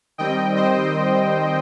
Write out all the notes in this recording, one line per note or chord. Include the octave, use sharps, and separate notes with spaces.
D#3 G3 C4 D#5 G5
C5 D#5